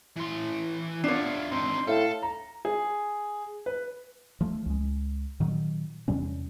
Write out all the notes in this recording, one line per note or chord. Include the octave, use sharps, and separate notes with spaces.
E3 C6
B3 D4 F4 C#5 E5
C4 D#4 C6
A2 A4 F5
A#5
G#4
B4
F3 A3
C#2 G#3
A#2 D#3 F#3
E2 C3 G3 C#4